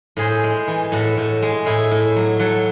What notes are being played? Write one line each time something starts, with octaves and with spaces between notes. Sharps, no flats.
A2 G#4 C5
G#3
E3
A2 F#4 A4
A2
G#3
A2 E4 G#4
A2
F#3
F#3 F#4 A4